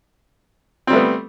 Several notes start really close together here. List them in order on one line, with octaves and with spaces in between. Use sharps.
C4 G3 A3 B3